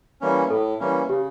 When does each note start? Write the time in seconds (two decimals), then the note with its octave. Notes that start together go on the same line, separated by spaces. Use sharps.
0.21 E3 G3 A#3 C#4
0.50 A2 A4
0.80 E3 G3 A#3 C#4
1.09 C#3 G4